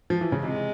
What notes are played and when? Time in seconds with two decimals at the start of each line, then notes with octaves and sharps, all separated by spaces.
0.10 F3
0.21 E3
0.32 C#3
0.42 C3 G#3